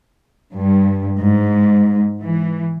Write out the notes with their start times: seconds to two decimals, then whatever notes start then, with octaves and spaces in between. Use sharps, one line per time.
0.55 G2
1.22 G#2
2.22 E3